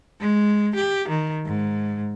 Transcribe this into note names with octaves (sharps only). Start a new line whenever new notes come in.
G#3
G4
D#3
G#2